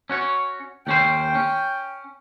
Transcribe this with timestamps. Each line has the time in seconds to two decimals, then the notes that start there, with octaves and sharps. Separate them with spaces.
0.10 C#4 F#4 C#5
0.87 D#2 C#4 C5 G5
1.35 C#4